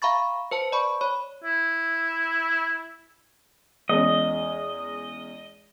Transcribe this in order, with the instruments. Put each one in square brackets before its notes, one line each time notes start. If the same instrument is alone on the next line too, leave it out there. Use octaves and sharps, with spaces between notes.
[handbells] E5 F5 A#5 B5 C#6 A6
B4 C5 A5
D5 A5 B5 C#6
C#5 B5
[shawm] E4
[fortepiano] E2 G#3 C#4 [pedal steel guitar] D#5